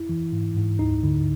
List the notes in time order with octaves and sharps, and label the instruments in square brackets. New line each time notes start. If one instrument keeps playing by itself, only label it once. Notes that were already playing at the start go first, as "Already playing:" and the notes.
Already playing: [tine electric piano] E4
E3
G#2
G#2
D2 D#4
D3